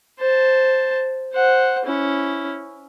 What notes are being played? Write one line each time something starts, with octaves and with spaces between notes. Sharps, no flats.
C5 A5
C5 F#5
C#4 E4